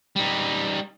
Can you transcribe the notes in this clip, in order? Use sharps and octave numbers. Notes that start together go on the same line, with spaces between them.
G3 D#4